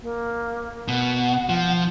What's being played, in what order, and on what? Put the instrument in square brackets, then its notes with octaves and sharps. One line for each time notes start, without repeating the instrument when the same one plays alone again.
[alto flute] A#3
[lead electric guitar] B2 [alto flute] F#5
[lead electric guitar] F3